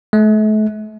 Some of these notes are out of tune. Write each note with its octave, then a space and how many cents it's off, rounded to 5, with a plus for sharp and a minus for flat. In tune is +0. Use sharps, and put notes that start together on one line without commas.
A3 -40